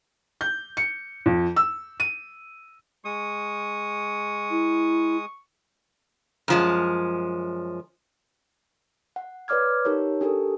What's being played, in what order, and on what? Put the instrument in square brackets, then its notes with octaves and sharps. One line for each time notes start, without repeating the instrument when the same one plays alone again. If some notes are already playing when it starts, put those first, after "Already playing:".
[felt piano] G6
C#7
F2
E6
D#7
[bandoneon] G#3 D#6 [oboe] C#6
[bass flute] E4
[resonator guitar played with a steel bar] F#2 F3 G#3
[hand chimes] F#5
B4 C#5 D5 D6 F6 G#6
D#4 G4 A#4 C#5
D4 G4 A4 A#4